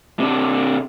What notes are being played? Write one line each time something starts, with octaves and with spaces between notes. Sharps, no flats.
C3 D4